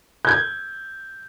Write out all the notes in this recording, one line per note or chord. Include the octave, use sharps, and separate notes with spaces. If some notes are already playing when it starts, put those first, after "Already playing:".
G6 G#6